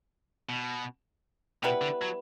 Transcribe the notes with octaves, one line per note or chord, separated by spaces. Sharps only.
B2
B2 G3 B3 E4 B4
D3
F#3